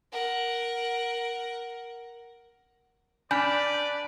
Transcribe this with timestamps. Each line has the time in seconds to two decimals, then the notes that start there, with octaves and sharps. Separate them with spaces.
0.12 A#4 F#5
3.31 D4 B4 D5 G#5 B5 F6 G6 B6